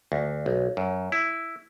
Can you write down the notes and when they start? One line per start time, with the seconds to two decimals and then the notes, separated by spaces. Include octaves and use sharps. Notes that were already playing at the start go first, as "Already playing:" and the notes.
0.12 D2
0.46 B1
0.77 F#2
1.12 E4